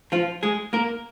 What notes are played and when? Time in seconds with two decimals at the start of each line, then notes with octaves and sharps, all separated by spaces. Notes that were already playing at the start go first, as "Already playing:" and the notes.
0.12 F3 F4
0.43 G#3 G#4
0.73 A#3 A#4